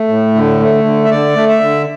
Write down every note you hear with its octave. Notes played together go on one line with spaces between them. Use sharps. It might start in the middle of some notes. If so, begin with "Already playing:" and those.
Already playing: A3
A2
D3
A3
D3
E5
D3 D5
A3
E5
D3